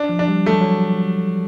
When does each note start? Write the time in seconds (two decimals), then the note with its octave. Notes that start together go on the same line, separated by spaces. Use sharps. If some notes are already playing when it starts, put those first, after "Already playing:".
Already playing: D4
0.09 F3
0.19 D4
0.28 G3
0.46 F#3 A3
0.61 F#3